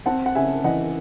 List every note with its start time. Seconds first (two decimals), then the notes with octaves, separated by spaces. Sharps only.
0.06 C4 F#5 A5
0.26 F#5
0.35 C#3 E5 G#5
0.64 E3 D#5 F#5